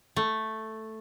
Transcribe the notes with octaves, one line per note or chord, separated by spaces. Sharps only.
A3